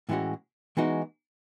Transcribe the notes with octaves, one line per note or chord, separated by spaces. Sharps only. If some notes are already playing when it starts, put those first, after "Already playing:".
A2 E3 G#3 C#4 F#4
E3 G#3 B3 D#4 F#4